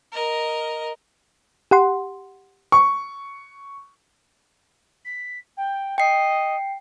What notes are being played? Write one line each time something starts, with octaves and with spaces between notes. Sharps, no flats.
A#4 D#5
G4 F#5 C6
C#6
B6
G5
D#5 G5 C7